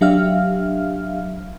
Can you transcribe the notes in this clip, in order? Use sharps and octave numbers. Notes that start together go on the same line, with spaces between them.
F#3 D4 G4 E5 F5 F6